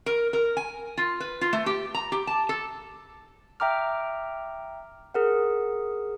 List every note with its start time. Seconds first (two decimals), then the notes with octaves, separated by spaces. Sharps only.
0.06 A#4
0.33 A#4
0.57 G#5
0.97 F4
1.20 B4
1.41 F4
1.53 A3
1.66 G4
1.94 A#5
2.12 G4
2.27 A5
2.49 A4
3.60 E5 G5 A#5 D6 F6
5.14 G#4 A#4 F#5